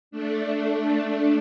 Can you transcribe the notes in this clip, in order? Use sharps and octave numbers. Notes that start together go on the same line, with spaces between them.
A3 D4